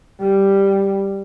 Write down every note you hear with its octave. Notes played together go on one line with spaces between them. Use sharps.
G3